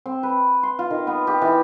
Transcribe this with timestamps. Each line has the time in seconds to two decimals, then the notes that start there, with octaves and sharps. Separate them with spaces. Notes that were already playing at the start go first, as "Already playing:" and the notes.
0.06 C4
0.23 B4
0.63 C6
0.79 F4
0.91 D#3
1.07 B3
1.27 G4
1.42 E3